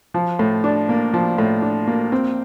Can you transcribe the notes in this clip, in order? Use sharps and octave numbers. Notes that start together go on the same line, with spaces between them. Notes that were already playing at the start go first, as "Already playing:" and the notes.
F3
A2
D4
A#3
F3
A2
D4
A#3
C4